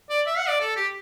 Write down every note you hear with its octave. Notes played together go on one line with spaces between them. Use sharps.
D5
E5
F#5
D5
A4
G4